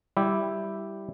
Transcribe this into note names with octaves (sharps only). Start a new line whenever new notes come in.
G3 E4 G4